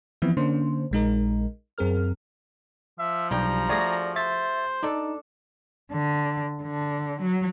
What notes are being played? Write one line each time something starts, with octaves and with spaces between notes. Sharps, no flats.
E3 F3 B3 C4 E4
D3 A#3 C#4 D4 C5
A#1 G#3 D#4 A#4
F#2 C4 G#4 A#4 F6
F3 E5
B1 G2 G3 G5 A#5
A3 F#4 G#4 D5 A#6
C5 E5 A6
D4 D#4 A4
D3
D3
F#3